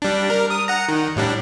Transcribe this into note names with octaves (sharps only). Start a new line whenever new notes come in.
G3 D4
A#4
D#6
F#5 A#5
D#3
A2 G3 D4